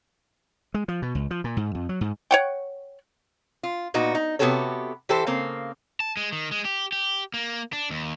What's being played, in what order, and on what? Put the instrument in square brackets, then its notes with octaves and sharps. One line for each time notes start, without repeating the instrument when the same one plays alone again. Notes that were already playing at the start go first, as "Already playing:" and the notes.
[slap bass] G#3
F3
B2
C#2
F3
A#2
G#2
F2
F#3
G#2
[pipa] C#5 F#5 G5
[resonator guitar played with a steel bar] F4
A#2 B3 D#4 F#4
D#4
C3 B3 F#4 G4 A4 C#5
E3 G4 A4 C5
C#3 A#3 C4
[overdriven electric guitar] A5
G#3
D#3
G#3
G4
G4
A#3
D4
D#2